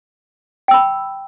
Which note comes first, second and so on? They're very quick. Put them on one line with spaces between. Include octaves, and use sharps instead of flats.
G5 E6 B5